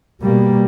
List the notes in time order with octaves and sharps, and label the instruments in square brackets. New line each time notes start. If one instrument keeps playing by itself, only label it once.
[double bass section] B2 G3 A#3